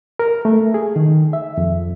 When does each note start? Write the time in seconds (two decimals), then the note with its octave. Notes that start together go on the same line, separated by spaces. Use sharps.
0.19 A#4
0.45 A3
0.74 G#4
0.96 D#3
1.33 E5
1.58 F2